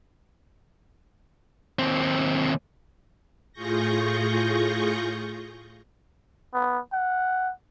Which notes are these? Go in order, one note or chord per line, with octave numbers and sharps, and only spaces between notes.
D#2 C4
A2 F4 G#4 C#6 G6 A#6
B3
F#5